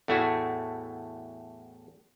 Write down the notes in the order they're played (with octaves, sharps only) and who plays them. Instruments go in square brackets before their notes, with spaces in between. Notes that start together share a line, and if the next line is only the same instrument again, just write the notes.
[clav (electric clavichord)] E2 A2 A3 E4 F#4